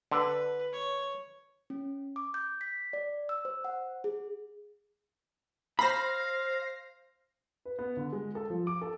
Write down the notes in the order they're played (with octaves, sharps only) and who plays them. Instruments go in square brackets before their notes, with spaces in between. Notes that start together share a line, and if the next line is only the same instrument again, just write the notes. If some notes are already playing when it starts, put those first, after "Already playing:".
[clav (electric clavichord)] D3 [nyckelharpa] B4
[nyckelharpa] C#5
[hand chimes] C#4
D6
G6
B6
D5
E6
C5
F#5
G#4
[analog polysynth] C5 A#6 C7 [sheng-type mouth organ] F5 [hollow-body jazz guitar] B5
[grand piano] B4
B3
D3
G#3
A4
F3
D6
A4